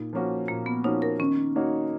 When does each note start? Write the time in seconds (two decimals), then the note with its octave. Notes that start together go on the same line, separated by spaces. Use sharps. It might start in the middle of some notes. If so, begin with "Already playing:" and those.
Already playing: A#2 D#4
0.13 F3 A#3 C#4 F#4
0.48 A#2 A#3
0.66 B3
0.84 F3 A#3 C#4 D#4 F#4
1.02 A#4
1.19 D#3 C#4
1.56 A#3 D#4 F#4 C#5